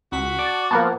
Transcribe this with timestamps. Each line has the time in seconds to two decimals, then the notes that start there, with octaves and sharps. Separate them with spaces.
0.12 C#2 F#4 B6
0.39 D5 A5
0.71 F3 A#3 B3 A#4 F#5 A5